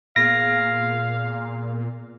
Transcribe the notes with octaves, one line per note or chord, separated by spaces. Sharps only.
A#2 B3 G#4 F5 A#6